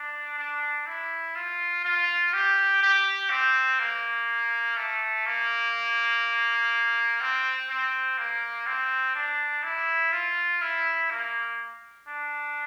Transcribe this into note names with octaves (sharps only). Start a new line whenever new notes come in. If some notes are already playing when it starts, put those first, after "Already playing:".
Already playing: D4
D4
E4
F4
F4
G4
G4
C4
A#3
A3
A#3
C4
C4
A#3
C4
D4
E4
F4
E4
A#3
D4